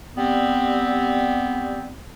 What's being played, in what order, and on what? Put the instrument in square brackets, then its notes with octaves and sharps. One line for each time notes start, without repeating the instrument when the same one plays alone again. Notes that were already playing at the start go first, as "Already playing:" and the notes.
[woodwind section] G3 B3 C4